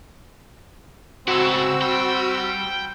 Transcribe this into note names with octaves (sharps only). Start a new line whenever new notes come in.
G#2 C#3 C4 E4 F#4 A4 E6
G3 G5